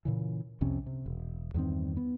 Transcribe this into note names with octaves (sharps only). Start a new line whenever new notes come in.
A#2 C#3 E3
C2 F2 C3 C#4
C3
E1
E2 G2 D#3 C4
B3